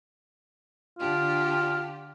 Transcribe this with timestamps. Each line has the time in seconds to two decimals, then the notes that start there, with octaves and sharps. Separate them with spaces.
0.99 D3 D4 F4 G4